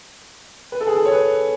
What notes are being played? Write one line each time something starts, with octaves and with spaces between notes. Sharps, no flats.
B4
A4
G#4
A4
C#5
B4